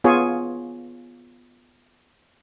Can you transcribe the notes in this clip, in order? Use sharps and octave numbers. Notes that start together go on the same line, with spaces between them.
B3 F4 G#4 C#5